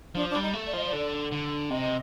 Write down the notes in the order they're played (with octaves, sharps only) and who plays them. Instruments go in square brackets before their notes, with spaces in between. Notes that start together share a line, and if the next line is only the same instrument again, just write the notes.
[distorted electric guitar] F3 [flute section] D4
[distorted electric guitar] G3 [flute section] D4
[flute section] D#4
[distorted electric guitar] A3
[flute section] D5
[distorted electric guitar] F3 [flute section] D#5
[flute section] D5
[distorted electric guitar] D3
D3
[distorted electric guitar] C3 [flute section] D#5